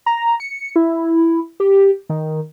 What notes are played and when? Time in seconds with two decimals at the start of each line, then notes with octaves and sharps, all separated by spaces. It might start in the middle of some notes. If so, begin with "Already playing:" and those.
0.06 A#5
0.40 C#7
0.76 E4
1.60 G4
2.10 D#3